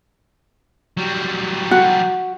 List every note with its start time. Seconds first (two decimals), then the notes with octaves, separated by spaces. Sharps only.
0.97 F#3 G3
1.71 F#4